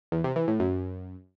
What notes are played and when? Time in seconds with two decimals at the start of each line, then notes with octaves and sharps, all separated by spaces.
0.12 E2
0.24 C3
0.36 E3
0.48 A2
0.60 F#2